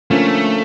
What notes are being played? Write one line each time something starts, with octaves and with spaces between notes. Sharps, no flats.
D3 F3 A3 A#3 C#4 F4